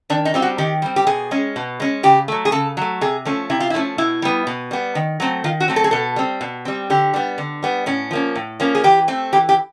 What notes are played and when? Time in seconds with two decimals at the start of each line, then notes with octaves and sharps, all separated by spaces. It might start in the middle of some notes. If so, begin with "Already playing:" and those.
0.10 D#3 D4
0.25 D#4
0.34 G3 C4 F4
0.42 F#4
0.58 D#3 G4
0.82 G3 C4
0.96 G4
1.07 B2 G#4
1.31 G#3 C#4
1.56 B2
1.80 G#3 C#4
2.03 C#3 G4
2.28 F#3 A3
2.45 G#4
2.52 C#3 A4
2.77 F#3 A3
3.01 C3 G#4
3.25 F3 A3 C#4
3.50 C3 E4
3.60 F4
3.70 E4
3.74 F3 A3 C#4
3.98 B2 E4
4.22 G3 B3
4.47 B2
4.71 G3 B3
4.95 D#3
5.20 F#3 A3 C4
5.44 D#3 F4
5.60 F#4
5.68 F#3 A3 C4
5.76 A4
5.84 G#4
5.91 B2 A4
6.16 G3 C4
6.41 B2
6.65 G3 C4
6.90 D3 G4
7.14 G3 B3
7.38 D3
7.63 G3 B3
7.86 A2 C#4
8.11 F3 A#3 C#4
8.36 A2
8.60 F3 A#3 C#4
8.75 G#4
8.84 E3 G4
9.08 A3 C4
9.33 E3 G4
9.49 G4